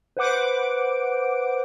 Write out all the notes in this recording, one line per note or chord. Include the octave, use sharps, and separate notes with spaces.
B4 C5 F#5 D6 D7